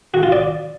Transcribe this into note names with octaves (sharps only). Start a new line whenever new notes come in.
F#4
F4
D5